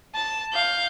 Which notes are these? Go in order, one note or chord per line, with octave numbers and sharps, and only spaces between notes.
A5
F5 G6